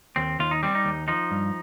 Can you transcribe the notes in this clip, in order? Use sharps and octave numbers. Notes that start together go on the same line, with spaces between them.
D#2 C4
D#2 F4
D#4
G3 C4
D#4
D#2
F3 D#4
G2